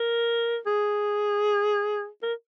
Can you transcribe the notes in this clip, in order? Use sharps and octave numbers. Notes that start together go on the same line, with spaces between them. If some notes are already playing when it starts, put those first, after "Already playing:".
Already playing: A#4
G#4
A#4